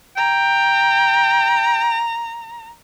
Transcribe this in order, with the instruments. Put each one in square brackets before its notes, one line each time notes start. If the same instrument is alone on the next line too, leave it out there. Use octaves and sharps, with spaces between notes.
[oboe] G5 [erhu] A#5